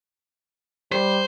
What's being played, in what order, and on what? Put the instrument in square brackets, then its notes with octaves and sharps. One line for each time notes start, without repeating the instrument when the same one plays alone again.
[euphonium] G3 [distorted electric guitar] C5